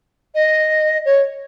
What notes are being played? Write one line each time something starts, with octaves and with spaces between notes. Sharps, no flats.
D#5
C#5